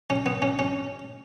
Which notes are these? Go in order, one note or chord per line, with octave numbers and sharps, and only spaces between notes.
C#4
B3
C#4
C#4